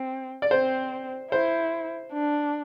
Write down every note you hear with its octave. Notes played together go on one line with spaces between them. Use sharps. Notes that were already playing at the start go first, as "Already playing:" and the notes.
Already playing: C4
D5
C4 C5
E4 C5
D4